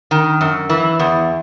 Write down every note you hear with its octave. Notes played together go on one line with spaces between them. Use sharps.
D#3
F#2
E3
E2